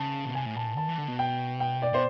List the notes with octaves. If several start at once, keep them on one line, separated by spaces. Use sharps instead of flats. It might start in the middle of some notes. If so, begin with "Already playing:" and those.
Already playing: C#3 A5
B2
C3 G#5
A2
A#2 A5
A2
D#3 A5
E3
D3
B2
G5
G5
D5
B2 C5